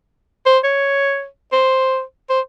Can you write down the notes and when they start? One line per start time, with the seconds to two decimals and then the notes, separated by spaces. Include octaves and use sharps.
0.46 C5
0.64 C#5
1.52 C5
2.29 C5